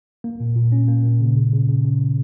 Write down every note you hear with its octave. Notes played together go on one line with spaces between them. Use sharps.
A#3
A#2
A#2
C#4
A#3
A#2
C#3
C#3
C#3
C#3
C#3
C#3